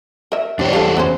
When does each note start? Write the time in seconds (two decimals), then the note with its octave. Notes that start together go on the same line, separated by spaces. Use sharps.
0.32 A#4 E5
0.59 E2 D4 G4 C5 C#5
0.73 G3 F4 A4
0.97 B3 C#4 C5